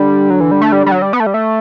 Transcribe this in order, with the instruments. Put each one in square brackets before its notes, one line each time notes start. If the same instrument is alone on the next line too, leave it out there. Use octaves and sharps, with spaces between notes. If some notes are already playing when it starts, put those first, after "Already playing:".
Already playing: [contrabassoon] D3 [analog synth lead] G3
[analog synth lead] F#3
E3
G3
A3
G3
G3
F#3
G3
B3
A3
G3
A3